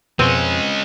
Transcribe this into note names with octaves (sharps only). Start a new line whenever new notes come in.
F2 B2 G#3 C4 C#4